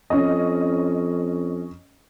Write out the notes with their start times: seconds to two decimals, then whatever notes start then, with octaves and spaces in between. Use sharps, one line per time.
0.10 F2 C#4 D#5